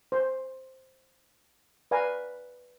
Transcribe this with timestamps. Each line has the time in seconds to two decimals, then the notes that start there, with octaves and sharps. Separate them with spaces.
0.12 C5
1.91 B4 D5 F5 G#5 A#5